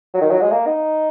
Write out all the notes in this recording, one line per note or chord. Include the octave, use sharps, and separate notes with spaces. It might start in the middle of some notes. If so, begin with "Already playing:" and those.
F#3
D#3
F#3
G#3
A#3
D#4